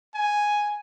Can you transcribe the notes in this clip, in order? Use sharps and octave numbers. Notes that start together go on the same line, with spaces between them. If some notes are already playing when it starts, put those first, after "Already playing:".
G#5